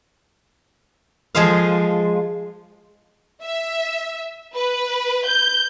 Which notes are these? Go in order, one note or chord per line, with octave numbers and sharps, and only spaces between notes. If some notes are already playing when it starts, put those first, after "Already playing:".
F3 G#3 G#4 C5 F5
E5
B4
G6